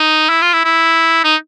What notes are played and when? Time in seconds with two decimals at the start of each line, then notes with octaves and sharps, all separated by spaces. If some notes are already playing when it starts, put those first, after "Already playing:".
Already playing: D#4
0.30 E4
0.42 F4
0.53 E4
0.65 E4
1.24 D#4